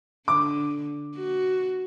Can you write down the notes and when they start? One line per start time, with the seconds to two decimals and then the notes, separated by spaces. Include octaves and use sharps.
0.28 D3 D6
1.16 F#4